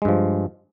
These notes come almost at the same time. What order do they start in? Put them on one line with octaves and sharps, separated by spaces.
G#3 G2 F3